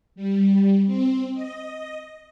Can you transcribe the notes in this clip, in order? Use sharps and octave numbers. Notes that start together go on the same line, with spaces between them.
G3
C4
D#5